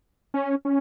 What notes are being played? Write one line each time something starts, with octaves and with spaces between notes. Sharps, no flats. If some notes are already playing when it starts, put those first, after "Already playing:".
C#4
C#4